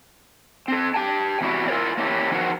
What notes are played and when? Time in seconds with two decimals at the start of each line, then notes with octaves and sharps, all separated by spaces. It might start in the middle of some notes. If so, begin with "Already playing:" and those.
0.68 C4 A4
0.94 G4 G5 A5
1.41 E2 C3 G3 E4 F#4 E5
1.68 E4 F4 A#4 C#5 D5
1.97 A#3 C#4 E4 G4
2.31 F3 D#4 F#4 A#4 F#5 G5